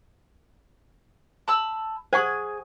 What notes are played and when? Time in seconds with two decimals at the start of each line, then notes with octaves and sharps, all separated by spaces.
1.48 A5 B5 E6
2.13 G#4 C5 F#5 G#5 C#6